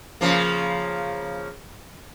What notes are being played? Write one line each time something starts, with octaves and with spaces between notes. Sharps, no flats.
C#3 F3 A#3